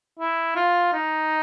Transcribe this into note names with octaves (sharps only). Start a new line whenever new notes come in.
E4
F4
D#4